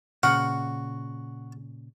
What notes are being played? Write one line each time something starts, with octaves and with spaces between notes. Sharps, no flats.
A#2 C#3 F#4 F#5 F6